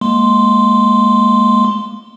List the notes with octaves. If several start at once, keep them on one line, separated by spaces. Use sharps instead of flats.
G#3 A#3 C6